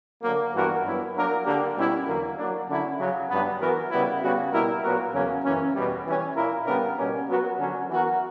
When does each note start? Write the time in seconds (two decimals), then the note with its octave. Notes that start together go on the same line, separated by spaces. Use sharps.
0.23 D3 F#3 A#3
0.53 G2 E3 B3 F#4 A#4
0.84 G2 F#3 B3 E4
1.14 F#3 A#3 D4 A#4
1.45 D3 A#3 D4 G4
1.76 B2 G3 C#4 E4
2.07 E2 D3 F#3 A#3
2.37 F#3 A#3 D4
2.68 D3 F#3 C#4 E4
2.98 C#3 F#3 C#4
3.29 G2 F#3 B3
3.60 E3 B3 F#4 A#4
3.90 C#3 G3 B3 E4
4.21 C#3 G3 B3 F#4
4.52 B2 G3 A#3 E4 A#4
4.82 A#2 F#3 B3 F#4 A#4
5.13 E2 C#3 F#3 A#3 C#4
5.43 F#2 E3 A#3 C#4
5.74 E2 B2 G3
6.05 E3 G3 C#4
6.35 A#2 A#3 E4 A#4
6.66 C#3 G3 B3 D4 A#4
6.97 B2 G3 A#3 C#4
7.28 F#3 B3 F#4 A#4
7.58 D3 F#3 C#4
7.89 E3 B3 F#4 A#4